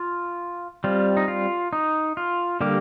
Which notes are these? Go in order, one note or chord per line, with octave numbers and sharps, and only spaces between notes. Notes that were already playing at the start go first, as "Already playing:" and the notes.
Already playing: F4
G3 C4 F4
D#4
F4
D#4
F4
D3 G3 A#3 G4